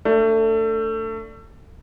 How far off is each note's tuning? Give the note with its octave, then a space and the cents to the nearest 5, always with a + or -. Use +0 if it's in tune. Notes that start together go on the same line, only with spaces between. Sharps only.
A3 +25 D4 +0